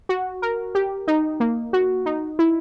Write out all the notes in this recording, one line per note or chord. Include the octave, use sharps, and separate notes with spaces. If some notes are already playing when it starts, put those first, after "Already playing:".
F#4
A#4
G4
D#4
A#3
F#4
D#4
E4